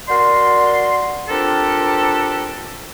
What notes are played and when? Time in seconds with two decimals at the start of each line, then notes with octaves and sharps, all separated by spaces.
0.08 F#4 A#4 D5 C6
1.29 C4 D4 F4 G4 A4 A#4